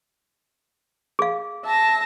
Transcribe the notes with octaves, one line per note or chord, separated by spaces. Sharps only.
G#4 F5
E5 A5 A#6